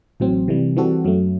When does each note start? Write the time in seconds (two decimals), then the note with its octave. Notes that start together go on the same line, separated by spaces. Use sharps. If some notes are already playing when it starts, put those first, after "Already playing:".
0.20 A1 A2 F#3 C4
0.48 C3 E3 G3
0.76 E3 G3 C4 F#4 A4
1.05 F#2 F#3 A3